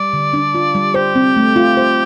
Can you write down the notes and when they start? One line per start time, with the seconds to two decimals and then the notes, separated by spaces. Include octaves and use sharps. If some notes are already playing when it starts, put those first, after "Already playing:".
Already playing: G3 D5
0.13 D3
0.33 D4
0.55 F4
0.75 G3
0.94 G4 C5
1.15 C4
1.36 A3
1.56 F4
1.77 C5